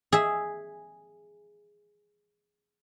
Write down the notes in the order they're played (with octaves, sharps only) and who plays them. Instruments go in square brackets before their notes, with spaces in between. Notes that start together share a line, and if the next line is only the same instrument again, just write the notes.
[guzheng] G#4 E5